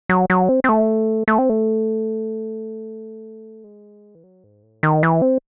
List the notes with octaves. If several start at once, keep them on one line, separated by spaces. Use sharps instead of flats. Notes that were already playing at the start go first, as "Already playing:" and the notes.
F#3
F#3
C4
C4
A3
A3
C4
A3
G#3
E3
F#3
G#2
A2
D#3
E3
C4